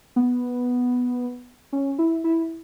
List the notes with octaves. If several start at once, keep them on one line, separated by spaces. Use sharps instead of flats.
B3
C#4
E4
E4